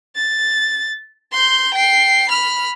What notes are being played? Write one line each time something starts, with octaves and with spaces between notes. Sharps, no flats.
A6
C6 G6
G5 C7
B5 F6